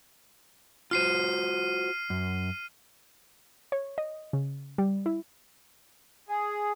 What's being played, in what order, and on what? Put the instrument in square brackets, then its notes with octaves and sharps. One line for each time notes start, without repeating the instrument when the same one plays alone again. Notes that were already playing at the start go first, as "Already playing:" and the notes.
[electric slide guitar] F4 F#4 C5 [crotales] F6 C7 D#7
[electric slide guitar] F#2
[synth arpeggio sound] C#5
D#5
C#3
G3
E4
[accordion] G#4